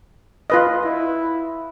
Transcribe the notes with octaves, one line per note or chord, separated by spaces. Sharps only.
F4 B4 D#5
E4